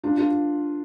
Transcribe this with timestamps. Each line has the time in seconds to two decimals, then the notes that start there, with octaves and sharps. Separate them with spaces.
0.03 D4 F4
0.17 D4 F4